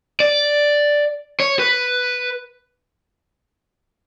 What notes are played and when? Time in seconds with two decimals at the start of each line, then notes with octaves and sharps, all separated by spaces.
0.20 D5
1.40 C#5
1.59 B4